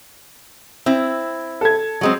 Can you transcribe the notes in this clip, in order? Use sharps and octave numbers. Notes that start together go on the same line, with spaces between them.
C4 E4
A4 G#6
F#3 G#3 C4